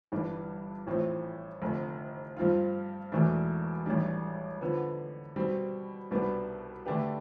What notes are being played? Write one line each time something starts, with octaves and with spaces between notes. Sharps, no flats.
G1 G2 E3 G3 D4
A1 A2 F3 C4
F1 F2 D3
G2 F3 C4 F4
E1 E2 B2 A3 D4
A1 A2 G3 D4
D3 F3 B3
B2 G3 C4
C2 B2 G3 B3 D4
D3 A3 D4 G4 B4